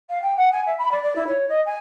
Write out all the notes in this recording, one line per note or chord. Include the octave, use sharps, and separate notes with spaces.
F5
G5
F#5
G#5
E5
B5
D5
D5
E4
C#5
D#5
G#5